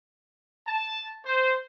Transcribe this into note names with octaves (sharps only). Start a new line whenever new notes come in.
A5
C5